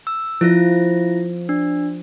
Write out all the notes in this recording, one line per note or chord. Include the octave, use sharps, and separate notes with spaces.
E6
F3 E4 F4 A#6
D4